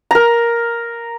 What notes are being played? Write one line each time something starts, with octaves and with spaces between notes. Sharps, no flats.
A#4 A#5